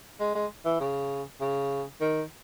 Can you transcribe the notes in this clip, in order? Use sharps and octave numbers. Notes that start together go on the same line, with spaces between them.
G#3
G#3
E3
C#3
C#3
D#3